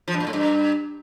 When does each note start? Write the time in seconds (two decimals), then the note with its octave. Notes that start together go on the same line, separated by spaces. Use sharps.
0.08 F3
0.14 G2
0.20 A#2
0.27 A2
0.33 G2